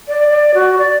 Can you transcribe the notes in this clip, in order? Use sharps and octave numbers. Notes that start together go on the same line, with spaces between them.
D5
D5
F#4
D5